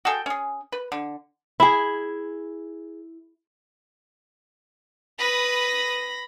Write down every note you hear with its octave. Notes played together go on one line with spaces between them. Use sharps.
F#4 G#4 A4 G5
C#4 G#4
B4
D3
E4 G#4
B4 B5 D#6 A#6